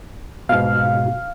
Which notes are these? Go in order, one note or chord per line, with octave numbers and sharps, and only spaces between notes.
G#2 B2 F5